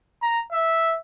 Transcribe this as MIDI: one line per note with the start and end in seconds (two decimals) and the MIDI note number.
0.22 0.40 82
0.52 0.95 76